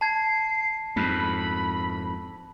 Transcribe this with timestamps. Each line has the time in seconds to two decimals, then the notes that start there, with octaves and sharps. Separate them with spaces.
0.01 A5 G#6 C7
0.96 F2 G#2 B5